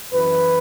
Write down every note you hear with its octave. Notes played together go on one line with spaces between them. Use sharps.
F#2 E3 B4